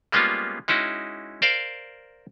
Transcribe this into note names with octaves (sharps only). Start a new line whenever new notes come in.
G3 G#3 A#3 B3 C#4 F4
G#3 C#4 D#4 E4 F#4
A#4 C5 D5 F5